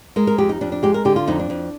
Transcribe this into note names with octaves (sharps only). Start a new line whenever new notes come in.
G#3 A#4
A#4
F2 G4
D#4
F2 D4
D4
G#3 G4
A#4
D3 G4
F4
F2 D#4
D4
F2